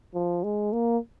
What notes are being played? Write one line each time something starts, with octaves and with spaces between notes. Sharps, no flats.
F3
G#3
A#3